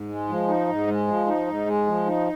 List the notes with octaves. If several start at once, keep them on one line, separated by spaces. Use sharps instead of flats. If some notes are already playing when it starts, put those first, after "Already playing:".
Already playing: G#2
G#3
F3
D#4
G#2
G#3
F3
D#4
G#2
G#3
F3
D#4